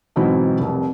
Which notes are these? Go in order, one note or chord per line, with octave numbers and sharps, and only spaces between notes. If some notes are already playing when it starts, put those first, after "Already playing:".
G#2 B2 E3 F#3 C4 E4
F1 C2